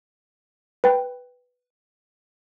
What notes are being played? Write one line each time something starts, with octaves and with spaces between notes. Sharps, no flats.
B4 G5